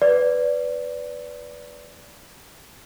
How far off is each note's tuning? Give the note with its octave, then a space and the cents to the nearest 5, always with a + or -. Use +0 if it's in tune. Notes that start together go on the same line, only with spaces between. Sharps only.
B4 +10 D5 -15